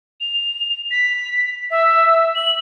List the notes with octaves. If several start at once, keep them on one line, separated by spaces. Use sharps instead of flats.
F7
B6
E5
F#7